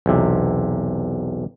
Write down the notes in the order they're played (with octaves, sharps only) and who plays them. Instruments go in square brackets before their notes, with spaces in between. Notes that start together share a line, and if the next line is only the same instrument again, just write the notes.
[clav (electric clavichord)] B1 E2 C3